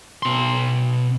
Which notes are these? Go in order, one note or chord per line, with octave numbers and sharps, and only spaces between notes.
B2 C6